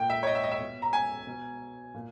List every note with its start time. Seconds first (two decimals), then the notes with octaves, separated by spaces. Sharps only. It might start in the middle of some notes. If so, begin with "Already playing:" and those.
Already playing: A#2 G5
0.10 E5
0.23 C#5
0.27 D#5
0.35 E5
0.44 D#5
0.51 E5
0.60 B2
0.82 A#5
0.93 G#5
1.27 B2
1.94 A#2